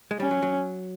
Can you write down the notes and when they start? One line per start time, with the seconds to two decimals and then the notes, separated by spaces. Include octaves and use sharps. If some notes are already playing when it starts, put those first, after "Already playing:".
0.11 G#3
0.19 G3 C#4
0.31 F#3
0.42 F#3